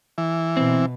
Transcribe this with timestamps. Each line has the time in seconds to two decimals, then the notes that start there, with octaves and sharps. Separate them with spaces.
0.18 E3
0.57 B2 C4